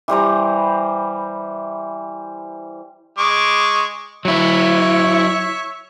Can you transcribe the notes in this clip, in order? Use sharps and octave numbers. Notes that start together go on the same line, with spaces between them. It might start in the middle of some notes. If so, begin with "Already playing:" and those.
E3 G3 C5 A#5
G#3 C#6 D6
F#3 E4 C#5 E5